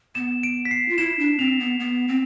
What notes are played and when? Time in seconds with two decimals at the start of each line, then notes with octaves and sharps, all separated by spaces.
0.15 B3 E7
0.43 D7
0.65 B6
0.71 C7
0.88 F4
0.98 E4 E7
1.19 D4
1.39 C4 F7
1.60 B3
1.80 B3
2.08 C4